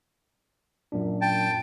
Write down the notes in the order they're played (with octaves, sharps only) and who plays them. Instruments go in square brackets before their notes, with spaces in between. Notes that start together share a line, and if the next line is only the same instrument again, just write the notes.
[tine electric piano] F#2 A#2 D4
[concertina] G5 A5